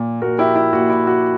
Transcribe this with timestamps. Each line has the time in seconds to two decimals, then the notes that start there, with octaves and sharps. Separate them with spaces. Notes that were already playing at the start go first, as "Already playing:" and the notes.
Already playing: A#2
0.22 A#2 F#4 A#4
0.39 E4 G4
0.56 E4
0.73 A#2 F#4
0.90 E4
1.07 F#4